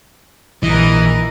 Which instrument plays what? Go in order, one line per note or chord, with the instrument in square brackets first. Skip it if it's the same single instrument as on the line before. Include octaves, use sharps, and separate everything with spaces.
[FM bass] A#1 [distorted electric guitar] E3 [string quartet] A#4 D#5